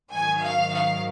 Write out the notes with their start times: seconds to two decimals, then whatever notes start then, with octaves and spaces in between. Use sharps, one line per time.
0.10 G#2 D#3 F#3 G#5
0.41 F5
0.71 F5